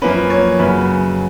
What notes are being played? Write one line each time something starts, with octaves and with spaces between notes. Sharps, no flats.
F#2 F3 A#3 C#4 B4
C#5
F#2 C#3 F#3 C#4 B4